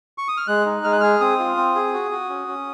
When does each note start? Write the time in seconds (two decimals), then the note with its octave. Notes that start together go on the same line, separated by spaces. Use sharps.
0.18 C#6
0.28 D#6
0.37 F6
0.47 G#3 F#6
0.66 D#4
0.84 G#3 F6
0.93 F#6
1.01 G#4 F6
1.20 C4 D#6
1.39 F4
1.57 C4
1.75 G#4
1.93 F#4
2.11 F#4
2.29 C#4
2.48 C#4